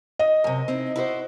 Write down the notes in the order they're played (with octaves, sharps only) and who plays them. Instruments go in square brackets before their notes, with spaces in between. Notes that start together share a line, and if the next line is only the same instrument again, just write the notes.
[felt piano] D#5
[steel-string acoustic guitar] F#2 C3
C4 D#4 E4
E4 F#4 C5